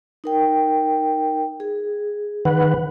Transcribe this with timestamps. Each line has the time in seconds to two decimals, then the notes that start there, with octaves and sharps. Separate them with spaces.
0.24 D#4 A#4 G5
1.60 G#4
2.45 D#3 B4 F#5